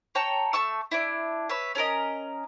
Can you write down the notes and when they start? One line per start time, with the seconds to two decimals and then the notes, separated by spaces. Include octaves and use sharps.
0.15 C#5 G5 A5 A#5
0.53 A3 A5 C#6 E6
0.91 D4 E4
1.49 B4 C#5 E5
1.75 C#4 A4 A#4 D#5